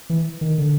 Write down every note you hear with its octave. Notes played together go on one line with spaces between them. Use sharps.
E3
D#3
D3